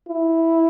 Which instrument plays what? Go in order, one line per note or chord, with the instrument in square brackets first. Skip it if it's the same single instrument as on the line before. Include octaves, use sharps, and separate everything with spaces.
[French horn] E4